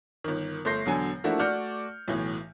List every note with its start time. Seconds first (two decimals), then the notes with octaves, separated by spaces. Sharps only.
0.24 G1 D#3
0.65 G1 A3 C6 G6 A#6 C7
0.85 E1 B2 D3 F#3 G#5
1.24 F3 A3 A#3 D4 E4 F#4
1.39 A3 F#4 D5 F6 G6 C#7
2.08 B1 A2 E3